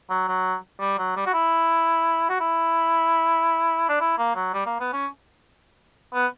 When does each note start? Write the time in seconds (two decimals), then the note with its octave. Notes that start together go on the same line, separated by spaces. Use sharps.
0.10 F#3
0.28 F#3
0.80 G3
0.98 F#3
1.16 G3
1.26 F#4
1.33 E4
2.30 F#4
2.40 E4
3.89 D4
4.00 E4
4.18 A#3
4.35 F#3
4.54 G3
4.66 A#3
4.80 B3
4.93 C#4
6.14 B3